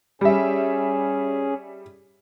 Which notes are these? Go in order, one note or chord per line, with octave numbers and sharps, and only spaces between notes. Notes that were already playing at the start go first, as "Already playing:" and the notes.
G3 C#4 G#4 E5